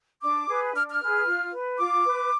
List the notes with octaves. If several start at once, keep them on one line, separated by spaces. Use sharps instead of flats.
D4 D6
G#4 B4
D4 F6
F6
G#4 B4
F4
B4
F4 D6
B4